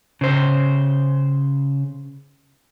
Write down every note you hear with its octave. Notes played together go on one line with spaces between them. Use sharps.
C#3 C5